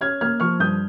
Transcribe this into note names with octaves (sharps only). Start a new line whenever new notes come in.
C#4 F6 G#6
A#3 F6 G#6
F3 C#6 F6
G2 D#6 G6